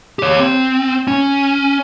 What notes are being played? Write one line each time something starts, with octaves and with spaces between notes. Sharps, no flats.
G4 C#5
C4
C#4